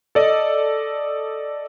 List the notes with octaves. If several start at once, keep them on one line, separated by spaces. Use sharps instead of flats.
A4 D5 D#5